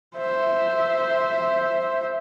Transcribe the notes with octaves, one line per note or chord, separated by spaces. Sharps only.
C5 E5